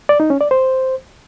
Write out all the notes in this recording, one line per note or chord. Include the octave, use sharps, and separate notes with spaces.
D5
D#4
C#4
D5
C5